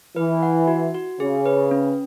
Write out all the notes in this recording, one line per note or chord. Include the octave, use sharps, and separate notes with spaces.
E3 B4
F#5
F#4
F#4
C#3 G#4
B4
C#4